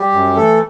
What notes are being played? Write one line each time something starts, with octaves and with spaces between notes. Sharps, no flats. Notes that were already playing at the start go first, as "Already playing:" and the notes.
Already playing: G3 G4
F#2
E3 A3 A4